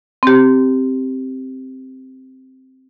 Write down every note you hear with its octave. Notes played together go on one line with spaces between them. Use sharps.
C4 G4